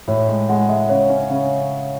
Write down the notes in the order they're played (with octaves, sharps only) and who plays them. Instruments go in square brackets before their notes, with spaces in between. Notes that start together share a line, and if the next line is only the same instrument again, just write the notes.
[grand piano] A2 [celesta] C#5
[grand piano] G#3
[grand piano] G#3 [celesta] F#5
[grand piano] G#3 [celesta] E5
[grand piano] C#3 [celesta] C#5
[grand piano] C#4
C#3